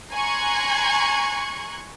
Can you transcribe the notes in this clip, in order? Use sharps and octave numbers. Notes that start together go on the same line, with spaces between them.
G#5 A#5 C6 C#6 F#6 G#6